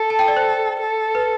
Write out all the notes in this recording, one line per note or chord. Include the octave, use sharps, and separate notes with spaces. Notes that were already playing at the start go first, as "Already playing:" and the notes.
Already playing: A4
A5
G5
D5
C5
A4
B4